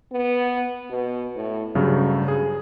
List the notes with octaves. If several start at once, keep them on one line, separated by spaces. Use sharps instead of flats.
B3
B2
A2
D2 G2 C#3 F#3
G#4